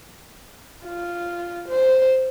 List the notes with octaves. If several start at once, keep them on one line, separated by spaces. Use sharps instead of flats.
F4
C5